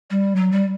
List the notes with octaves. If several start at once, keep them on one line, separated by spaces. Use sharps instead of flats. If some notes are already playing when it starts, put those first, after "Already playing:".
G3
F#3
G3